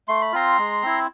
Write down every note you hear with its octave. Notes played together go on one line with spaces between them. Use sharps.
A3 C6
B5
C4 F4 A#5 C6
G#3
C4 E4